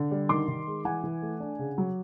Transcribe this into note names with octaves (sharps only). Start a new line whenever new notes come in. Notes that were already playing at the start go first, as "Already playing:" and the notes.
Already playing: D3
G3
D#3 C6 D6
D#3
G#3
E3 F#5 G#5
E3
A3
D4
C#3
F#3